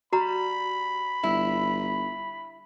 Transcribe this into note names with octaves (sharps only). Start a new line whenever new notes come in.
G3 F#4 A#5 B5
G1 E4